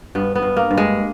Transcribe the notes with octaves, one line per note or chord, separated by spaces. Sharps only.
G2 B3
B3
G2
A#3
G2
G#3